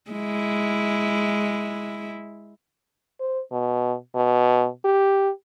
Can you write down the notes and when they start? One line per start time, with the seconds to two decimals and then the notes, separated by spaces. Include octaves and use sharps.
0.11 G#3 E4
3.20 C5
3.52 B2
4.15 B2
4.85 G4